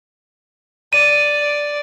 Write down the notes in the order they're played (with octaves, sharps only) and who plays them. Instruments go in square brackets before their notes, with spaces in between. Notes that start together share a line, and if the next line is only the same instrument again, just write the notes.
[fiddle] D5 [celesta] D#7